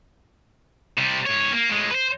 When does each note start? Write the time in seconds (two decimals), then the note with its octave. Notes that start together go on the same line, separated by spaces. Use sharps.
0.97 C3 G3
1.26 G#2 C#5
1.52 A#3
1.69 A2 G#3
1.90 B4 C5